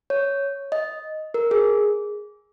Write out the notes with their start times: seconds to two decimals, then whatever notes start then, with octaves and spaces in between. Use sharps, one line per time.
0.10 C#5
0.72 D#5
1.34 A#4
1.51 G#4